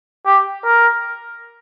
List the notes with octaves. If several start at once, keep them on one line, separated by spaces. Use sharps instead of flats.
G4
A#4